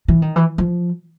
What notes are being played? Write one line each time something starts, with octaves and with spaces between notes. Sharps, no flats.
E3
D#3
E3
F3